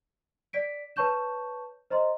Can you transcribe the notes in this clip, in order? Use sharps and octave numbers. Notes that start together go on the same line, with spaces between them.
D5 B6 D7
B4 C#5 A5 C#6 G6 E7
C5 D#5 A#5 C6